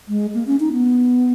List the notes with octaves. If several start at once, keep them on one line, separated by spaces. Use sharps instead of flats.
G#3
A#3
C#4
D#4
B3